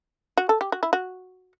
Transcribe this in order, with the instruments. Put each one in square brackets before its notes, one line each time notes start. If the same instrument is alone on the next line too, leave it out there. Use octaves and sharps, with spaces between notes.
[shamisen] F#4
A4
G4
F#4
E4
F#4